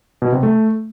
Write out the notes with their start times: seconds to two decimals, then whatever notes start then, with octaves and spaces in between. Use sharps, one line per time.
0.22 B2
0.32 C3
0.43 A3